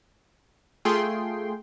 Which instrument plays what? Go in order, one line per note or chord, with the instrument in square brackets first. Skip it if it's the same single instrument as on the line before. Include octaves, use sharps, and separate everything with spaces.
[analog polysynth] A3 F4 G#4 G5 C6